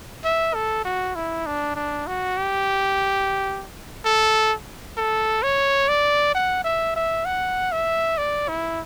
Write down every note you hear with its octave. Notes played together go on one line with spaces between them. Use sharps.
E5
A4
F#4
E4
D4
D4
F#4
G4
A4
A4
C#5
D5
F#5
E5
E5
F#5
E5
D5
E4